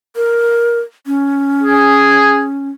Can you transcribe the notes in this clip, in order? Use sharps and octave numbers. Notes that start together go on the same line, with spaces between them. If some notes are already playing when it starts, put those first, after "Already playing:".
A#4
C#4
G#4